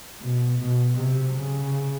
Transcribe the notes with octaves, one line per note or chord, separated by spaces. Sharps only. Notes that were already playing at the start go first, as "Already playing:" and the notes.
B2
B2
C3
C#3